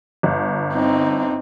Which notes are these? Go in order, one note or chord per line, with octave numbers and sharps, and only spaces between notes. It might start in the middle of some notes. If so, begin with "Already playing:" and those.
G1
C4 D#4